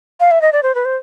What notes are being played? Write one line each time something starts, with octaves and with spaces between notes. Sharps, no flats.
F5
E5
D#5
D5
C5
B4
C5